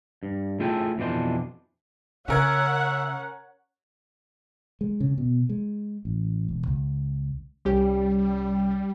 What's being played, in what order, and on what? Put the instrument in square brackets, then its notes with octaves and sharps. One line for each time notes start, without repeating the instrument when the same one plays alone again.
[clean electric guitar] G2
A3 E4 F4 G#4 A4 G5
F2 B2 E3 D4 C5
[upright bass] C#3 [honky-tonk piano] C#4 A#4 G#6 [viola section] C#5 F#5 [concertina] E5
[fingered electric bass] G#3
C#3
B2
G#3
A1
E1
C#2
[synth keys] C2 C#4 G4 [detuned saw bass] G3